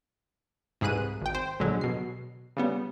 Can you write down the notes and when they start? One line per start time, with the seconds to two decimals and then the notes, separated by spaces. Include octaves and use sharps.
0.81 C2 G#2 G#4 B4 F#6 D#7
1.21 G#1 G5
1.35 C5
1.60 A#1 D3 F#3 G#3
1.81 B2 C7
2.57 C#3 G3 B3